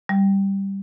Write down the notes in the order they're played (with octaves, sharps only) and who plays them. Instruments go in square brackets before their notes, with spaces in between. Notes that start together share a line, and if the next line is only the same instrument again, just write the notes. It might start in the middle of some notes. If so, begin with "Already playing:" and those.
[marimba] G3